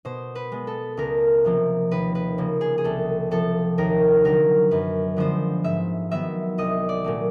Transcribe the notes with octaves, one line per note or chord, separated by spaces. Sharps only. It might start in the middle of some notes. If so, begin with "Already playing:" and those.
B2 C5
B4
G#3 B3
A4
C#2 A#4
C3 F3 A#3
D#2 B4
B4
C#3 F3 A#3
G#4
G#4
C2 A4
C3 F3 A4
D#2 A#4
D3 F#3 A#3 A#4
F#2 B4
D3 F3 G#3 B3 C5
G#2 E5
D#3 F#3 B3 E5
C2 D#5
D5
A#2 F#3 A3